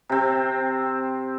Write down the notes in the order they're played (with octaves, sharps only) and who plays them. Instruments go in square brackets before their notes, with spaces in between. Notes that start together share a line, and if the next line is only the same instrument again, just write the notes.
[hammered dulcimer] C3 C4